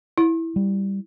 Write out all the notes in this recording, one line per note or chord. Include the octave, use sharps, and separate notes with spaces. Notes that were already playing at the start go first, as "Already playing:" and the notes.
E4
G3